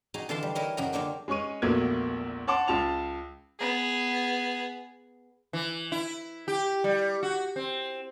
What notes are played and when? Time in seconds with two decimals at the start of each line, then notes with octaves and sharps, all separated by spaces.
0.14 D#4 F#4 G#4 A#5
0.29 D3 E3 A4 F5 A5 C6
0.43 G3
0.55 D#4 E4 A#4 C#5 D#5
0.77 F#2 C#3 F#4 F#5 A#5
0.92 D3 F#3 A#3 D4 F4 G4
1.28 G#3 C#4 C#5 C#6 D#7
1.62 A#1 E2 F#3 A3 A#3 G#6
2.47 C#5 F#5 A5 C6 D6
2.68 C#2 F4 A5 F7
3.59 B3 G#4
5.53 E3
5.92 E4
6.48 G4
6.84 G3
7.23 F#4
7.56 C4